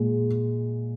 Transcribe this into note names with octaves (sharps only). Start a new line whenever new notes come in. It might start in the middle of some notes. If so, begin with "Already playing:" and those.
Already playing: A#2 G#3